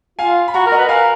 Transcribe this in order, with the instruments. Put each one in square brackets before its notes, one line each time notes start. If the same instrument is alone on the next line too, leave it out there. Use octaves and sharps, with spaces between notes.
[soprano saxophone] F4 [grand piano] F5 G#5
[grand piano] B5
[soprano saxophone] F#4 [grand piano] F#5 A#5
[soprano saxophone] A#4
[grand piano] D#5 F#5
[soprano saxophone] B4
[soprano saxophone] A#4 [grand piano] F5 G#5